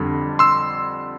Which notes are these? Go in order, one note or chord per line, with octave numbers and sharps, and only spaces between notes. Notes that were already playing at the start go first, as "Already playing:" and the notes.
Already playing: F2 D3 G3
C6 E6